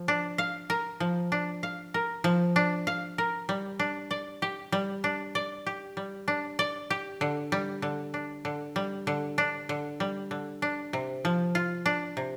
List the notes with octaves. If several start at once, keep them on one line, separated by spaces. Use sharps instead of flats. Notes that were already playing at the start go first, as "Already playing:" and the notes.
Already playing: F3
D4
F5
A#4
F3
D4
F5
A#4
F3
D4
F5
A#4
G3
D4
D5
G4
G3
D4
D5
G4
G3
D4
D5
G4
D3
G3
D3
D4
D3
G3
D3
D4
D3
G3
D3
D4
C3
F3
F4
D4
C3